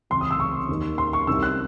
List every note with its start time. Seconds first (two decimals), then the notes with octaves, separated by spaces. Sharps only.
0.10 C#2 C3 E3 C6
0.21 D#6
0.31 E6
0.40 C#6
0.69 D#2 D#3
0.98 C6
1.13 C#6
1.27 C2 C3 D#3 E6
1.43 F#6